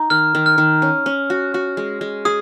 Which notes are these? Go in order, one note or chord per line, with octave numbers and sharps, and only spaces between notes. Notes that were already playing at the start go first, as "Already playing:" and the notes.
Already playing: D#4
D#3 F6
D#3
F6
D#3
C#4
C#4
F#4
F#4
G#3
G#3
G#4 D#6